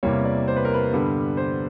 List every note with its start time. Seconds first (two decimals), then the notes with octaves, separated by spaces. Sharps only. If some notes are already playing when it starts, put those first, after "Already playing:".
0.03 E2 C3 E3 G3 A#3 C#5
0.25 D5
0.48 C5
0.56 B4
0.65 A#4
0.74 B4
0.93 G2 D3 G3 B3
1.37 C5